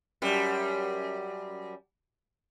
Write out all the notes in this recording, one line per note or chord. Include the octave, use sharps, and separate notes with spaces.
F#2 G3